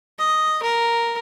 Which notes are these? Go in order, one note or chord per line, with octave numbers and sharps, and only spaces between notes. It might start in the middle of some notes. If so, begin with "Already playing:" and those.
D#5
A#4